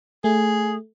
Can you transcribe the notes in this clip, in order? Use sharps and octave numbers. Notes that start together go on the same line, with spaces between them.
A3 G#4